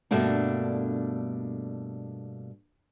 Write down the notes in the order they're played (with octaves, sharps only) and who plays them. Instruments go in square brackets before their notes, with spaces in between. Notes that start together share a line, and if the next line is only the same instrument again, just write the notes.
[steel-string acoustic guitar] G2 B2 A3 A#3 D4